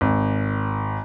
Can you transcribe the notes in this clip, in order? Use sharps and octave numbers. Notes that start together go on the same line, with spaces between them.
G#1